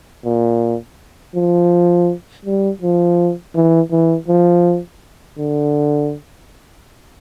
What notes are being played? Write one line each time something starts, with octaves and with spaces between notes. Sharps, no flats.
A#2
F3
G3
F3
E3
E3
F3
D3